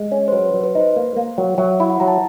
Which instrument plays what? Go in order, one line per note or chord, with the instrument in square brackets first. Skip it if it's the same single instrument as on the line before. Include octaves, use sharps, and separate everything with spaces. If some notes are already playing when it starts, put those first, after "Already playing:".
Already playing: [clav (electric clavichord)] G#3
C#4
[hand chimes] C5
[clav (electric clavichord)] F#3 [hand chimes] B4
[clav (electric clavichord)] F#3
[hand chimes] B4
[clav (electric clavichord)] D#4 [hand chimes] C5
[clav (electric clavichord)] A#3
A#3
F#3
[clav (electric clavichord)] F#3 [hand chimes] E5
[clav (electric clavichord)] E4
[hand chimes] F#5
[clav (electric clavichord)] F#3 [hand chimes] A#5
[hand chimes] A5